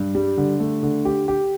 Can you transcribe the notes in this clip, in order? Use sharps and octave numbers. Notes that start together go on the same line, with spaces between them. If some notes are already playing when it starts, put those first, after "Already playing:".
Already playing: G2
G3
D3
A3
D3
G4
G4